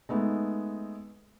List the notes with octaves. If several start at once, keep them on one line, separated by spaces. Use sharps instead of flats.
G#3 A3 B3 D#4